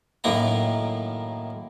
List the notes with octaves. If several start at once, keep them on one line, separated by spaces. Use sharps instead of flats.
F#2 A2 D#3 A#3 A#5